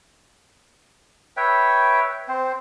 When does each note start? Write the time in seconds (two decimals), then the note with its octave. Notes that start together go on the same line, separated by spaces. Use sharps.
1.37 B4 C#5 E5 G5
2.28 C4 C5